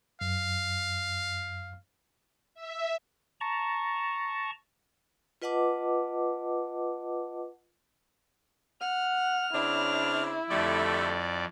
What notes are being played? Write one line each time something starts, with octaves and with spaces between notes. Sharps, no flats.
F#2 F5
E5
A5 A#5 C#6
F4 B4 D#5 F#5 A5 D6
F#5 F6
C#3 C4 D4 E4
F2 D3 G3 A3 D5